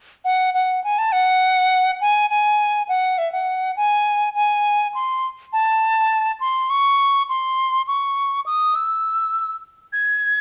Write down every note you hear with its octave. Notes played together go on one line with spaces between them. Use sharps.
F#5
F#5
G#5
A5
F#5
G#5
G#5
F#5
E5
F#5
G#5
G#5
C6
A5
C6
C#6
C6
C#6
D#6
E6
G#6